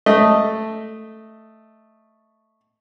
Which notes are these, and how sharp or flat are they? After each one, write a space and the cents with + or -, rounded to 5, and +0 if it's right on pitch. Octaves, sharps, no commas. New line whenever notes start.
A3 +0 D#5 +0